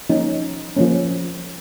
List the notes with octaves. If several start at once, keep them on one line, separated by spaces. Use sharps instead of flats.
F3 A#3 C#4 D#4
F3 A#3 C#4